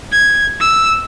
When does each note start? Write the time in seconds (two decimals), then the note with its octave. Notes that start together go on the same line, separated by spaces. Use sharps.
0.12 G#6
0.60 E6